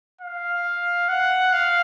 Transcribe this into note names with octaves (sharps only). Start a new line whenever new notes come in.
F5
F#5
F5